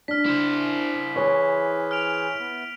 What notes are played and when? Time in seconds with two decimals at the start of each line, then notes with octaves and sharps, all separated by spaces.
0.08 D4 F6 B6
0.26 E4 C5
1.16 E3 G#4 B4 C#5
1.91 F6 D7 F7
2.40 B3